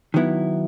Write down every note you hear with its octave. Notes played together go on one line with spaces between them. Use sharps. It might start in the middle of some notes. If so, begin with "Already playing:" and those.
D#3 F#3 B3 E4